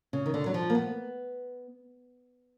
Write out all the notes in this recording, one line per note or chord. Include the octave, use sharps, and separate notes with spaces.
C#3
D#3
D3
F#3
F3
A#3
B3